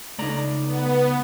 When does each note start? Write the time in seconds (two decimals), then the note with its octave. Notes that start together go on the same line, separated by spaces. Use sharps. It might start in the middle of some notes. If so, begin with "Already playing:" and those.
0.18 C#2 A3 D#4 D5 A#5
0.61 B3